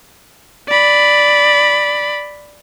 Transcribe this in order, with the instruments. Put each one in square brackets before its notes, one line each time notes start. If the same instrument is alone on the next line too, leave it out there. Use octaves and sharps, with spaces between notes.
[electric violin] D5 B5